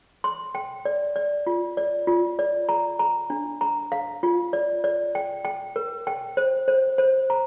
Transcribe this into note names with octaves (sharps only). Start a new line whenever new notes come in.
C6
G5
D5
D5
F4
D5
F4
D5
A#5
A#5
D4
A#5
F5
F4
D5
D5
G5
G5
A#4
G5
C5
C5
C5
A#5